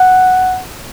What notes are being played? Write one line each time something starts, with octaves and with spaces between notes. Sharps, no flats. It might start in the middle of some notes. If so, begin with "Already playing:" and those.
Already playing: F#5